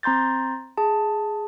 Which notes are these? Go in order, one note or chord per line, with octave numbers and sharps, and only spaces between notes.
C4 A#5 C6 G6 A6
G#4 A5